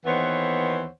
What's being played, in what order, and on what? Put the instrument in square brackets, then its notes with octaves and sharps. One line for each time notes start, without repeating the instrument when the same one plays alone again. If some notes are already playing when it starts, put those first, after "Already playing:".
[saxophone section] D#2 E3 B3 C5 C#5 F#5